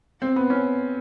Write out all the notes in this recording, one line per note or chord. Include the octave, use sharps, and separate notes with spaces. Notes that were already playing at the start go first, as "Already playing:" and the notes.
C4
B3
C#4